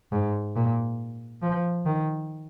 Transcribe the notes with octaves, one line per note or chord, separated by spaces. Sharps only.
G#2
A#2
F3
D#3